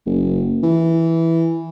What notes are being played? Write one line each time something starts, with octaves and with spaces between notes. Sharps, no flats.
F#1
E3